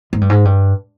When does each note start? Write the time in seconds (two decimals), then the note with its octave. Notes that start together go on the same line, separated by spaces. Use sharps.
0.13 G#2
0.21 G2
0.30 G#2
0.45 G2